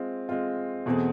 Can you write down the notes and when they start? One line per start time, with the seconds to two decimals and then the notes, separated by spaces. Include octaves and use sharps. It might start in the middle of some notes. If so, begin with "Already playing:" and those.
Already playing: G#3 C4 F4
0.29 G#3 C4 F4
0.86 E2 B2 A3 C4 G#4